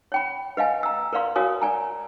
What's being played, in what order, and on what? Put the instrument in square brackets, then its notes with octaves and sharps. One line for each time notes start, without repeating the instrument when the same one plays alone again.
[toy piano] C#5 G5 B5
B4 D#5 F5 G#5
A#5 E6
A#4 B4 D5 F5 C6
F#4 A#4 C#5 F5 G#5 D#6
D5 G#5 A#5